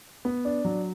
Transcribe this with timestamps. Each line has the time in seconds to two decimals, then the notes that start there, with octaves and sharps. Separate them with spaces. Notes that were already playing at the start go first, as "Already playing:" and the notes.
0.25 B3
0.45 D4
0.65 F#3